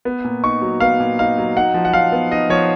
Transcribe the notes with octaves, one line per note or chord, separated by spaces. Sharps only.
B3
A#2
D#4 C#6
F#3
B3 F5
A#2
D#4 F5
F#3
D#4 F#5
F3
F#5
F3 F5
B3
D#4 D#5
F3 C#5